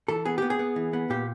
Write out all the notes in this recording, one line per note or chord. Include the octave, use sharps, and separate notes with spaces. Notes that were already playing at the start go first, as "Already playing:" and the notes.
E3 A4
B3 G#4
B3 G4
G#4
B3
E3
B3
A#2 G4